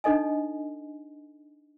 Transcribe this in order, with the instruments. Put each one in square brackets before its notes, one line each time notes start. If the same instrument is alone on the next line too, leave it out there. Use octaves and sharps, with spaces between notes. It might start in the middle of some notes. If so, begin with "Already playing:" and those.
[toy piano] D4 D#4 A4 D#5 G#5